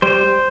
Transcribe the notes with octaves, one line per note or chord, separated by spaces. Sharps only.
G3 C5